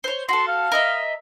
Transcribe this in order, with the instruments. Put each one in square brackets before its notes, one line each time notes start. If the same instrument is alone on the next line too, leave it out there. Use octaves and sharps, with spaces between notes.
[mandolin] C5 C#5
[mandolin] F#4 A4 [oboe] C6
[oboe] F5
[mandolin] A#4 D#5 E5